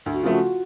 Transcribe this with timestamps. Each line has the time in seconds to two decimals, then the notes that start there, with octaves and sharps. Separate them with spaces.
0.06 D2
0.14 F#4
0.23 C#3 F3 A3 F4
0.32 F#4